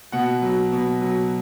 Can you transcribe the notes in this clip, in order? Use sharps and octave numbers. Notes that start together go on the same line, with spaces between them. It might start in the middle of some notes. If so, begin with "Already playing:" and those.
B2 F#5
F#3
B2
F#3